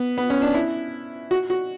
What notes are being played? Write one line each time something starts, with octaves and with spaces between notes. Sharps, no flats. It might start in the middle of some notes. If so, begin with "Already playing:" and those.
Already playing: B3
B3
C#4
D4
E4
F#4
F#4